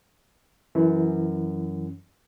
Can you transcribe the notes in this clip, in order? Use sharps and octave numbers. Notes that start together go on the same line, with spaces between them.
F#2 E3